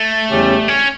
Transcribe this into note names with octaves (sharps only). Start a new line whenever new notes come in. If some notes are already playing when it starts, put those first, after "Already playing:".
Already playing: A3
E2 C#3 G3 C#4 G4
C#4